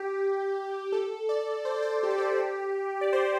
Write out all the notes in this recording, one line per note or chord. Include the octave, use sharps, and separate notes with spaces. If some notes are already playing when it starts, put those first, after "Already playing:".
Already playing: G4
A4
D5
C5
A4
C5
G4
A4
G4
D5
C5